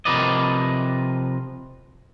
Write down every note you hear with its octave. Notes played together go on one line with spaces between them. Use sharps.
C3 F3 A#4 B4 D5 D#5